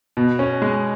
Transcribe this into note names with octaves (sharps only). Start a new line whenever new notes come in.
B2
C#4
G#3